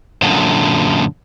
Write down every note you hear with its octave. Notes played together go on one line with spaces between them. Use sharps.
F#2 A#2 D3